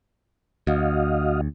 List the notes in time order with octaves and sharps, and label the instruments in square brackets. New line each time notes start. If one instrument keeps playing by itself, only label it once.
[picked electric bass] D2 [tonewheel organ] F#4 D#5 F5